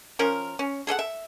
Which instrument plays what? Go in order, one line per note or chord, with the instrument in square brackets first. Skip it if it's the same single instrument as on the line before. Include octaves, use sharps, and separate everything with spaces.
[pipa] F3 C#4 A#4
C#4
G#4 A4 D#5 F#5
E5